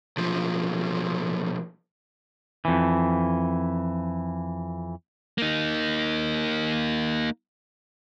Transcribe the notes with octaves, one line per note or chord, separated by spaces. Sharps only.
B1 F3
F2 E3
A#3 D#4